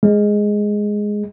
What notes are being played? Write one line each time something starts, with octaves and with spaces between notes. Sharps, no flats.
G#3